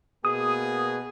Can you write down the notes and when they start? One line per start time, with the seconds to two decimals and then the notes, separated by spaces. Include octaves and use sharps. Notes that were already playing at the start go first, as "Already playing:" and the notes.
0.25 B2 A#3 G#4 D#6